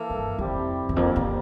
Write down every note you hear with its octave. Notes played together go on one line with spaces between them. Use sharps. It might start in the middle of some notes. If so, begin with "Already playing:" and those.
Already playing: E3 A#3 E4 A4
G2
F2 C3 G3 C4 E4 G4
E2
F2 D3 G3 A#3
E2